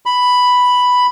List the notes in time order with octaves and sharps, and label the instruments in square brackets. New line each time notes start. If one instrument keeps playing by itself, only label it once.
[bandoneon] B5